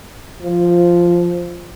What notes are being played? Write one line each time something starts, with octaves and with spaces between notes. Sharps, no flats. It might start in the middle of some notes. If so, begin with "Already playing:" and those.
F3